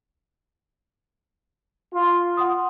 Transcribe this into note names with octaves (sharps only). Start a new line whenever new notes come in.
F4
F#5 C6 D#6